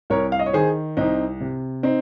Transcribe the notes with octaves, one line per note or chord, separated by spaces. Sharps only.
C2 A#4 C#5
F5
D#5
C#5
D#3 G#4 C5
C2 C4 D#4
C3
C4 D#4